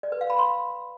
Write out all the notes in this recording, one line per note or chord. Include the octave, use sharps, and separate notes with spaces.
D5
B4
F5
B5
C6